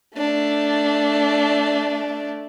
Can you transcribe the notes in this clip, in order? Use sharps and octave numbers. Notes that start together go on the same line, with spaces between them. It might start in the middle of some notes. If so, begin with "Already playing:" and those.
A3 D4